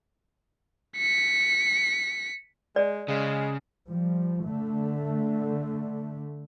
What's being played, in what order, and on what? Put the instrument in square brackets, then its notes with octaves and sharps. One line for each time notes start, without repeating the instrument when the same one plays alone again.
[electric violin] B6 C#7
[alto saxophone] G#3 [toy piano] D5
[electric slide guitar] C#3 [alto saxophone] G#3
[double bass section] F3 G3
D3 A3